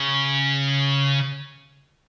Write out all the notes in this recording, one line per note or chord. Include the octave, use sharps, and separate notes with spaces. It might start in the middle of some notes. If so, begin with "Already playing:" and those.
Already playing: C#3